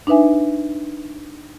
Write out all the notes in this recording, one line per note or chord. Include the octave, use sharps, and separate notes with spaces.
D4 D#4 B4 E5 G#5